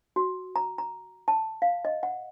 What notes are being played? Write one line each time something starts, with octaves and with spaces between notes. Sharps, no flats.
F#4
A#5
A#5
A5
F5
D#5
F#5